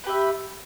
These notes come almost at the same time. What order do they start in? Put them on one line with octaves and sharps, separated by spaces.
B4 G4 E5